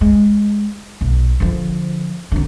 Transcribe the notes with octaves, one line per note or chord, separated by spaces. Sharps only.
G#3
B1
D3 F3
C2 D3